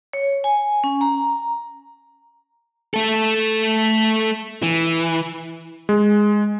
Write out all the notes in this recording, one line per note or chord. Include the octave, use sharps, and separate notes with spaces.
C#5
G#5
C#4
A#5
A3 A4
E3
G#3